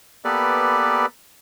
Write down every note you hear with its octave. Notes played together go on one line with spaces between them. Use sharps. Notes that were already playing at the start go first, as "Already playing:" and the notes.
A#3 B3 G4 A4 B4 D5